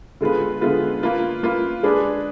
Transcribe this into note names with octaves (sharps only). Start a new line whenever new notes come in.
D3 G#3 B3 F4 B4
D3 G#3 B3 F4 B4
A#3 F4 B4
A#3 F4 B4
G#3 D4 G#4 B4